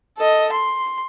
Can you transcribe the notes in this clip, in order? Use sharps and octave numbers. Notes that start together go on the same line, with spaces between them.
A4 D#5
C6